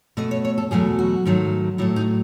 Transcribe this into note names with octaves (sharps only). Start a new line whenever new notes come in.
B2 A3 D#5
C#5
C#5
A4
E2 B2 F#3 A3 G#4
F#4
G#2 D#3 F#3 A3
A2 F#3 A3 E4
D#4